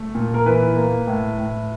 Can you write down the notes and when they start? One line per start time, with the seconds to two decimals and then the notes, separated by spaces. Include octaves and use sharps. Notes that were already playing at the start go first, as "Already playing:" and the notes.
Already playing: A3
0.15 A#2
0.34 A#4
0.46 E3 B4
0.77 A#3
1.07 A2
1.38 A2